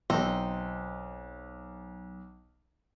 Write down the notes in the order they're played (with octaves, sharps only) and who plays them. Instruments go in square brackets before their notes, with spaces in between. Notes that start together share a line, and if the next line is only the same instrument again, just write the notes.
[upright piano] B1 [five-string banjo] C4 D#4